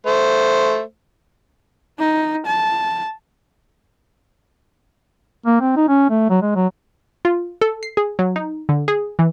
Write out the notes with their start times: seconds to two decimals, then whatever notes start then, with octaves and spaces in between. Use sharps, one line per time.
0.06 A3 C5
1.99 D#4
2.47 A5
5.46 A#3
5.61 C4
5.77 D#4
5.88 C#4
6.10 A3
6.30 F#3
6.42 G#3
6.55 F#3
7.25 F4
7.61 A4
7.83 C7
7.97 G#4
8.19 F#3
8.36 D#4
8.69 D3
8.88 G#4
9.19 E3